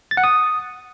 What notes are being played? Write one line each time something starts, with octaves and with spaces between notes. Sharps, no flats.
A6
F#5
D#6